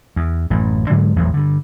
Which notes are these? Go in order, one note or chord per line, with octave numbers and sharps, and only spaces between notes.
E2
A1 F#2 A2
G#2 D3 F#3 G#3
A1 E2 A#2 F#3
G2 D3